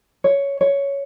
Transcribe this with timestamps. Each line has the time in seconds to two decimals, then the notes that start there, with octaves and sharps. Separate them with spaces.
0.24 C#5
0.61 C#5